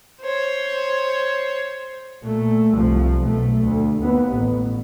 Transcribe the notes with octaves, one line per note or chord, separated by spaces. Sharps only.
C5 C#5
A#2 A3
C2 F3
B1 A3
D2
D#2 B3
A1